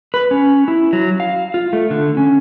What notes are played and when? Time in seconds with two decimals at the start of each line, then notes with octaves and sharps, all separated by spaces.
0.14 B4
0.31 C#4
0.68 E4
0.93 F#3
1.20 F5
1.54 F4
1.73 A3
1.91 D3
2.17 C#4